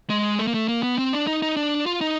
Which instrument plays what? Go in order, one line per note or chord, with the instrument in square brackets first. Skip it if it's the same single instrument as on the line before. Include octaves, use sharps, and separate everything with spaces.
[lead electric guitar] G#3
A3
A#3
A3
A#3
B3
C4
D4
D#4
D#4
D4
F4
D#4